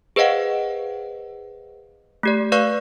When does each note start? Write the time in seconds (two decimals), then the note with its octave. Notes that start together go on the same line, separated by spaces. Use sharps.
0.16 G#4 B4 C5 D#5 F5 F#5
2.23 A3 G4 D5
2.52 B4 D5 F5 C#6 F#6